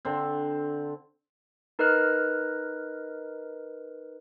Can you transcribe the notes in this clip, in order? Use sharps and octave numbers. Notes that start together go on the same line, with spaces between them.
D3 C4
D#4 A#4 B4 D#5 F6 F#6